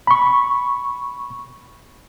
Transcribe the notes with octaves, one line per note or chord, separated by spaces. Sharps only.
B5 C#6